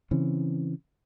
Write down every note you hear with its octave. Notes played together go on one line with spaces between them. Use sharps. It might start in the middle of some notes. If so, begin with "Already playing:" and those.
C#3 E3 C4 C#4